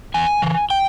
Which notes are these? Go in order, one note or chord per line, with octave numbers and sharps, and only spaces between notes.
E2 G#5
C#3 E3
G5